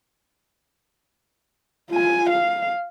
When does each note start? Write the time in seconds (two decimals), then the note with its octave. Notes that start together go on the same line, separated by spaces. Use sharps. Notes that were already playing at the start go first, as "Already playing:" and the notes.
1.90 F4 G#5
2.30 F5